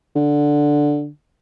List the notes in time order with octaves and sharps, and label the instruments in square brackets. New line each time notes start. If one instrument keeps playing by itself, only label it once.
[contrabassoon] D3